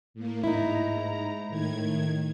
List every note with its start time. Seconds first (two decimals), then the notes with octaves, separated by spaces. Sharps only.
0.14 A2 A#3
0.44 G#2 D#4 E4 A#5
1.49 A2 D#3 G#6